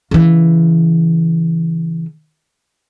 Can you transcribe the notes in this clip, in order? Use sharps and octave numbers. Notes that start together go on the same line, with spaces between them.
C#3 E3